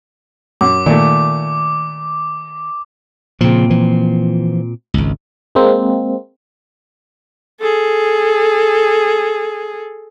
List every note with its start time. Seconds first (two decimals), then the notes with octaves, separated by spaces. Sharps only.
0.61 F#2 D6
0.86 A#2 D#3 A3
3.41 A#2 C#3 F3 C4
3.70 E3 F3
4.94 G#1 C#2
5.55 G#3 A#3 C4
7.60 G#4 A4